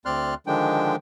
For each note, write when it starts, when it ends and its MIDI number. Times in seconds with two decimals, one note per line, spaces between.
0.05 0.34 38
0.05 0.34 60
0.05 0.34 74
0.05 0.34 84
0.05 0.34 89
0.05 0.34 90
0.47 0.96 50
0.47 0.96 51
0.47 0.96 53
0.47 0.96 56
0.47 0.96 62
0.47 0.96 79